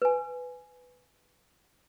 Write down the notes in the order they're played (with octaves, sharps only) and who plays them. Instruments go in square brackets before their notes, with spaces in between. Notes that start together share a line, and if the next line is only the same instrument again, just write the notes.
[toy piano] B4 G#5